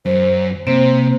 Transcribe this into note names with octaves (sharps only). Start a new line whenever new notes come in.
F#2 C5
C3 A#3 C4 C5